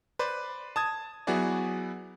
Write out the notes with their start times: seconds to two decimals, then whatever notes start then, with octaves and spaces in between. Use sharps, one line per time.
0.19 B4 C5 D5
0.76 A5 D#6 G#6
1.27 F#3 B3 E4 F#4 G#4 D5